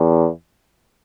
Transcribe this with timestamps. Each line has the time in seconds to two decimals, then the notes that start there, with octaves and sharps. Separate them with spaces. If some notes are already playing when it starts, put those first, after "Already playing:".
Already playing: E2